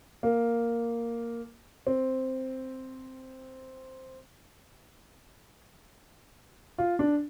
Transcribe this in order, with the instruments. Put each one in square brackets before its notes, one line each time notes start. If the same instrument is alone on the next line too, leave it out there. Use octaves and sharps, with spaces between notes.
[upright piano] A#3
C4
F4
D4